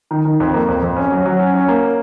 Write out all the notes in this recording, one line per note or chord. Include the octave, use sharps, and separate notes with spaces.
D#3
D#3
F2
A#3
F2
F2
C#4
F#3
F#3
C#4
C#4
A#3